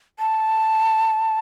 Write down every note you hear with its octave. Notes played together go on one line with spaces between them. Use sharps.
A5